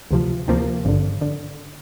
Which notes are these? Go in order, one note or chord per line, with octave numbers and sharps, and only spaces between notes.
D2 C3 F3
D2 C3 F3 A#3
G#1 G2 D3
D3